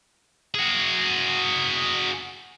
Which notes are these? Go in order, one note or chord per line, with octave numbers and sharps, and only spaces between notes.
F#4 G#4